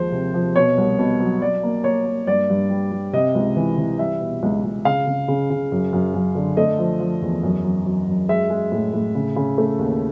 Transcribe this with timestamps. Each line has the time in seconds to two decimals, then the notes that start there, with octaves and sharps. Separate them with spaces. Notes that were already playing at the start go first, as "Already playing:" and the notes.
Already playing: D#2 F3 G#3 C5
0.12 C3
0.34 F3
0.56 B2 C#5
0.78 C2
0.99 B2
1.20 F#3
1.41 F#3 D5
1.63 A#3
1.84 A#3 C#5
2.06 A#3
2.27 G2 D5
2.50 G2
2.70 G3
2.91 G3
3.13 C3 D#5
3.35 C#2
3.56 E3
3.78 E3
3.99 G3 E5
4.21 B2
4.43 C#2
4.64 C#2
4.85 C#3 F5
5.07 C#3
5.28 C#3
5.50 C#3
5.72 F#2
5.93 F#2
6.14 F#2
6.35 D3
6.57 A3 D#5
6.79 F3
7.00 F3
7.22 E2
7.43 F#2
7.64 F#3
7.85 F#3
8.08 F#2
8.29 G#3 E5
8.50 G#3
8.72 A2
8.94 A2
9.15 C#3
9.36 C#3
9.58 A3
9.79 D#2